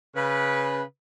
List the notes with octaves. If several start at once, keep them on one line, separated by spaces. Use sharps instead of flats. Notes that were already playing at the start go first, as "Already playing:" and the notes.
C#3 B4